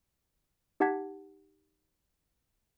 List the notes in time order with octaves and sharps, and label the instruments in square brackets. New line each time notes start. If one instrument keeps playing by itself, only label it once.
[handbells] D#4 G4 F#5 A5 G#6 B6